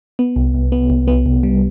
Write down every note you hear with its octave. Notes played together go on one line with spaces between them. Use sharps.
B3
C2
C2
B3
C2
B3
C2
G3